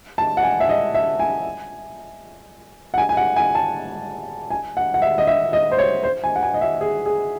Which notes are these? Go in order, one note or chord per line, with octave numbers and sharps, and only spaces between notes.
A5
F#5
G#5
E5
D#5
E5
G#5
F#5
G#5
G#5
F#5
G#5
A5
G#5
F#5
F#5
E5
D#5
E5
D#5
C5
C#5
C5
G#5
F#5
G#5
D#5
E5
G#4
G#4